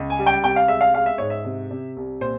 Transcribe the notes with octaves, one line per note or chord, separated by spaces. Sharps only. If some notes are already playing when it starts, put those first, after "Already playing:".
Already playing: C#2
G#5
G3
G5
C2 G5
F5
G#3 E5
F5
G#3 F5
E5
G#2 C#5
E5
C3
C3
C2
A#2 C5